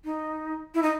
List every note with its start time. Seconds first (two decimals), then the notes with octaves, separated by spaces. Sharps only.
0.04 D#4
0.74 E4
0.82 D#4